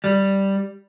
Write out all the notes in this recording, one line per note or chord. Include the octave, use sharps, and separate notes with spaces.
G3